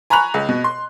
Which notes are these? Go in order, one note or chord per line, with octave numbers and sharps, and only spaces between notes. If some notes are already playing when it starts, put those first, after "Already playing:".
G#5 A#5 B5 C#6 F#6 F7
C#2
B2
C6